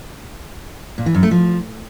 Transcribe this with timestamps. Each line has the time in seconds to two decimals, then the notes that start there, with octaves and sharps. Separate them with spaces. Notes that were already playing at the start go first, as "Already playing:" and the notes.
0.98 A#2
1.06 E3
1.14 F#2
1.23 A3
1.31 F3